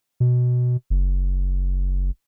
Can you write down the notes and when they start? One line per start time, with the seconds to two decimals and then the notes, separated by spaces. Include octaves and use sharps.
0.20 B2
0.90 F#1